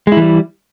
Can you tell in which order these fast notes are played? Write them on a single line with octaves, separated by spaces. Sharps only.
G#3 E4 E3 G3